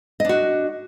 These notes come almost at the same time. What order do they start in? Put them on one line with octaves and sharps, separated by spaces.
D#5 D4 F#4